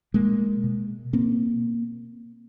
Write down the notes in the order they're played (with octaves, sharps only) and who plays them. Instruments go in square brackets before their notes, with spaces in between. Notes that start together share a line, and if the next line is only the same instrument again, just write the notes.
[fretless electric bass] B2 G#3 A#3
B2
B2 A#3 C4